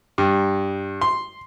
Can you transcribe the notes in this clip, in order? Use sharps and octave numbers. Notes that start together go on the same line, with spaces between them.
G2
C6